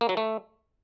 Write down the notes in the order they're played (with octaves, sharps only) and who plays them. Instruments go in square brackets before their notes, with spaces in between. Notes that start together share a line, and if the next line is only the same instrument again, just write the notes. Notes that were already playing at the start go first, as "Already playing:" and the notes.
[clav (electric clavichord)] A#3
F#3
A3